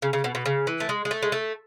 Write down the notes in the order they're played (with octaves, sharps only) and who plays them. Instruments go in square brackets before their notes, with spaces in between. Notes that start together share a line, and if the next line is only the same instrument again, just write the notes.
[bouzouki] C#3
C#3
B2
B2
C#3
E3
A3
G#3
G#3
A3
G#3
A3